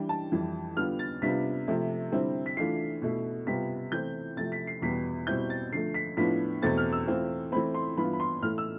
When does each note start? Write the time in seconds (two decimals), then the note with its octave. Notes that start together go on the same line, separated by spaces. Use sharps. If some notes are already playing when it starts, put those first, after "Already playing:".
Already playing: E3 G3 D4 G5
0.09 A5
0.32 F2 E3 G3
0.77 D3 G3 B3 F4 F6
0.99 A6
1.22 C3 G3 B3 D4 F4 B6
1.67 C3 F3 A3
2.12 D3 G3 C4 E4
2.46 B6
2.57 E3 A3 D4 F4 C7
3.02 B2 A3 E4
3.47 C3 G3 B3 F4 B6
3.92 E3 A3 C4 G6
4.37 C3 F3 A3 A6
4.52 B6
4.67 C7
4.82 E2 B2 G3 B3 B6
5.27 B2 G3 C4 E4 G6
5.50 A6
5.72 D3 F3 A3 C7
5.94 B6
6.17 A2 F3 B3 D4 F4 B6
6.62 E2 B2 A3 C4 A6
6.78 F6
6.93 E6
7.07 E3 A3 C4 F4
7.52 E3 A3 C4 B5
7.74 C6
7.97 G2 E3 B3 F4 B5
8.13 B5
8.20 C6
8.42 A2 E3 A3 F6
8.58 E6